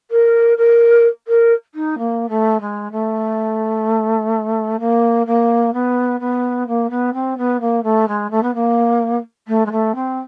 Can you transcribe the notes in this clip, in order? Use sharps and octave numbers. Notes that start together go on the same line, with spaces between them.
A#4
A#4
A#4
D#4
A#3
A3
G#3
A3
A#3
A#3
B3
B3
A#3
B3
C4
B3
A#3
A3
G#3
A3
B3
A#3
A3
G#3
A3
C4